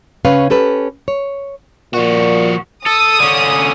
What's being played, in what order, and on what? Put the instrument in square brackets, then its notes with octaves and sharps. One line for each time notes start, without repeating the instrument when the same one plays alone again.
[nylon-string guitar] C#3 C#4 B4 C#5 F5
C#4 G4 A4 B4
C#5
[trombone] A#2 [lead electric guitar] F3 F#4
[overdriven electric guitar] A4 [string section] D#6
[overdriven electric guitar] D3 C#4